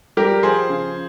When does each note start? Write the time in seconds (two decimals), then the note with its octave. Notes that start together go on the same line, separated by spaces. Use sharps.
0.17 G3 G4 A#4
0.43 F3 G#4 C5
0.69 C#3